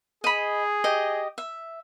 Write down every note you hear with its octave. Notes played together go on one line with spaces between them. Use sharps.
G#4 D#5 B5
G4 D#5
E5